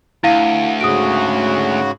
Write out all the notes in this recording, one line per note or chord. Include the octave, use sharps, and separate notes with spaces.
D2 E4 F5 D#7
G#2 C#3 F#4 D#6 D7